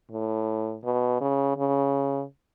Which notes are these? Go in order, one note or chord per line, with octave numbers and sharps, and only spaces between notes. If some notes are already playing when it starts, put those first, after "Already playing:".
A2
B2
C#3
C#3